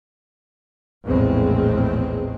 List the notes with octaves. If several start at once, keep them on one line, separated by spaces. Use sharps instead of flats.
A#1 E2 A2 G#3 C4